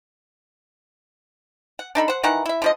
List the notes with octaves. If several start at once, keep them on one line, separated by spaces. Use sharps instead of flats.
F#5
D4 D#4 A4 B5
C5 F#5
D#3 E3 D#4 F#5
E4 E5
D3 F3 D#5